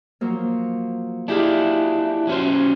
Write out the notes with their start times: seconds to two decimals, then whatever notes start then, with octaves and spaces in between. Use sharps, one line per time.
0.21 F3 F#3 A#3
1.28 D4 E4 F4 G4 G#4
2.27 F#3 C#4 C5